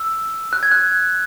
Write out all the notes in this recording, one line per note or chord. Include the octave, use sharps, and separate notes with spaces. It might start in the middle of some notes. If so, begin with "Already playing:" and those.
Already playing: E6
F#6
G#6
F#6